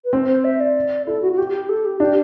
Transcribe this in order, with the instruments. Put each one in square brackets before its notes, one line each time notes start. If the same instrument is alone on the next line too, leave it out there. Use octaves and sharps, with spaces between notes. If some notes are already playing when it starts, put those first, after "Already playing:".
[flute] B4
[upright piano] C4 [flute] C5
[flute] C5
E5
D5
[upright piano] E4 [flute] A4
[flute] F#4
F#4
G4
G4
A4
G4
[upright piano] D4 [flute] G4